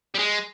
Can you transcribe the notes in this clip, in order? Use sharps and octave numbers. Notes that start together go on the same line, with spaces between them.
G3
G#3